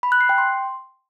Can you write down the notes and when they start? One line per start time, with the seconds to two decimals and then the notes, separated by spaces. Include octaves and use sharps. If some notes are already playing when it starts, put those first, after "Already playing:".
0.03 B5
0.12 F#6
0.21 C7
0.29 G5
0.38 C6